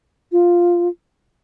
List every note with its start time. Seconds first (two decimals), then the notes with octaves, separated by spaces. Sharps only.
0.32 F4